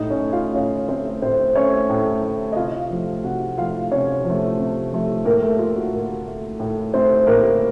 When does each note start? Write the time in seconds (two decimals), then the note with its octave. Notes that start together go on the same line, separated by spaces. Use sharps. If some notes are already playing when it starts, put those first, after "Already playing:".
Already playing: A2 D#4 D#5
0.10 C#4 C#5
0.22 A3
0.33 F4 F5
0.55 A2 C#4 C#5
0.88 A3 C4 C5
1.22 A2 C4 C5
1.55 A3 C#4 C#5
1.89 A2
2.23 A3
2.52 D#5
2.56 C3 F4 F5
2.90 F3 A3
3.24 C3 F#4 F#5
3.58 F3 A3 F4 F5
3.92 C3 C#4 C#5
4.24 F3
4.30 A3
4.59 C3
4.92 F3 A3
5.25 A2 A#3 A#4
5.42 A3 A4
5.59 A3 F4
5.76 F#4
5.93 A2 A#3 A#4
6.26 A3
6.59 A2
6.94 A3 C4 C5
7.27 A2 A#3 A#4